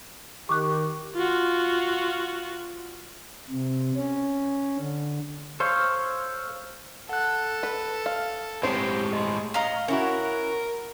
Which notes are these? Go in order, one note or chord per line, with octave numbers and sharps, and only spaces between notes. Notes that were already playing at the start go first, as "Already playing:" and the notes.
D#3 G4 C#6 D6 F#6
F4 F#4
C3
C#4
D3
A4 C5 C#5 F5
A4 F#5 F#6
B4
F5
A2 G#3 C4 G4 C5 C#5 C7
G#4 D#5 C6
C#4 D#5 F5 A#5
C#4 E4 F#4 A#4 C#5